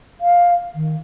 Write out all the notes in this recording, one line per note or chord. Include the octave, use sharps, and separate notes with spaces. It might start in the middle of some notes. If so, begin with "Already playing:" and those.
F5
D#3